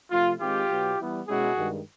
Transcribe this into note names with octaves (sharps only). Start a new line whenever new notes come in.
C3 F3 A3 F4
D#3 G#3 C4 F4 G4
B2 F#3 B3
E3 G3 B3
B2 G#3 C#4 E4 F#4 G#4
G2 D#3 G#3